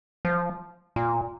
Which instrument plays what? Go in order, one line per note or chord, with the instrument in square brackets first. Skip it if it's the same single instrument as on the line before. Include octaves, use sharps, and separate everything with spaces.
[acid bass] F3
A#2